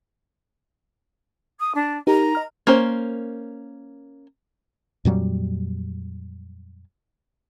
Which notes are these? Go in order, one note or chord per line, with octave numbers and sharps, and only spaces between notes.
D#6
D4
D#4 G4 A#4 A#5
D#5 F6
A#3 C#4 C5
F2 A#2 F#3 G3